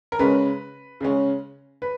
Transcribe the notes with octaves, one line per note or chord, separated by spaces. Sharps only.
A#4
C#3 G#3 C#4 B4
C#3 G#3 C#4
B4